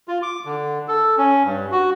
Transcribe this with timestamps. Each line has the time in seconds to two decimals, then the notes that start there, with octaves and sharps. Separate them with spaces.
0.08 F4
0.23 D6
0.45 D3
0.88 A4
1.18 C#4
1.44 G2
1.72 F#4